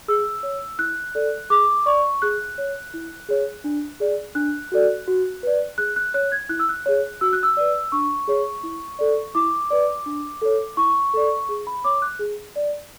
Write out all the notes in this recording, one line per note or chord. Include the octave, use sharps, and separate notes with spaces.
G#4 E6
C#5
E4 F#6
A4 D5
G#4 D6
D5 C#6
G#4 F#6
C#5
E4
G#4 C#5
D4
G#4 D5
D4 F#6
F#4 A4 D5
F#4
B4 D5
G#4 F#6
F#6
C#5 F#6
G#6
E4 F#6
E6
F#6
G#4 C#5
F#4 E6
F#6
E6
B4 D5
D4 C#6
G#4 C#5
E4
A4 D5
E4 D6
B4 D5
D4
A4 C#5
E4 C#6
A4 D5
G#4
B5
C#5 D6
F#6
G#4
D5